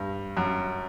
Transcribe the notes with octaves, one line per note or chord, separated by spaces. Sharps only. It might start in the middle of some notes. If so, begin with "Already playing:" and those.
Already playing: G2
F#2